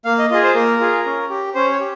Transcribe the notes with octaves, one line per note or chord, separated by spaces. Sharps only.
A#3 F5
D#5
F4 G#4 D#5
C5
A#3 A#4
F4 G#4
C#4
G4
C#4 C5
C#5
G4